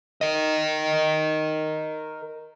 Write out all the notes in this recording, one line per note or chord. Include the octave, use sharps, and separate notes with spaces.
A#4 D#5